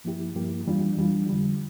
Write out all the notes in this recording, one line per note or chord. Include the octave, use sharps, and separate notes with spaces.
G2 F3 A#3 E4 G4
G2 F3 A#3 E4 G4
F2 E3 G3 D4 F4
F2 E3 G3 D4 F4
F2 D3 G3